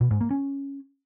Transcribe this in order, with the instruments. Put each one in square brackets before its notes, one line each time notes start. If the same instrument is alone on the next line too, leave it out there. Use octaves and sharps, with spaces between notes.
[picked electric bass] B2
G#2
A#3
C#4